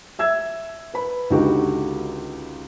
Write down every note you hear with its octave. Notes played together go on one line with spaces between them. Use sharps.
E5 E6 G#6
B4 B5
C#2 D3 D#4 F#4 G4